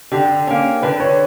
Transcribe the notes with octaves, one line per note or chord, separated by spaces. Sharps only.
D3 G4
A#3 C#4
D3 B4
C#5